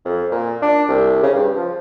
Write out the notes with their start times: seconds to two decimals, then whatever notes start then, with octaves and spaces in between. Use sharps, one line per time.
0.05 F2
0.31 A#2
0.62 D4
0.88 C2
1.22 C#3
1.34 G2
1.56 F3